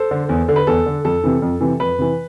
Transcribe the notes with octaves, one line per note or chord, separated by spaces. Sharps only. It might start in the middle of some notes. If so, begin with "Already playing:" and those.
Already playing: A4 C5
D3
E2
D3
B4
E2 A4
D3
F2 A4
C3 E3
F2
C3 E3
F2 B4
C3 E3